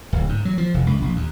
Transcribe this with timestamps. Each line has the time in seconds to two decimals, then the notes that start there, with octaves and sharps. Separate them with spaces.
0.13 D1
0.29 G#2
0.45 F#3
0.58 F3
0.74 F1
0.87 C#2
1.02 A#1
1.16 D#2